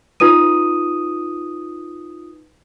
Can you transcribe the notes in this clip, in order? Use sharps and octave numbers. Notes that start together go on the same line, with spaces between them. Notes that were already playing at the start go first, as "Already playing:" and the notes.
D#4 F4 B4 D#6 D#7